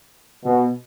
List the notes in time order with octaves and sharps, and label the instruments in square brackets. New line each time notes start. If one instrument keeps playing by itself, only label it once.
[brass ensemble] B2